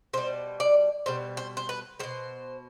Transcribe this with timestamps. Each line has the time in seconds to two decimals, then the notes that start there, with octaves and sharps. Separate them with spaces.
0.13 B2 G3 C5
0.60 D5
1.06 B2 G3 C5
1.37 C5
1.57 C5
1.69 B4
1.99 B2 G3 C5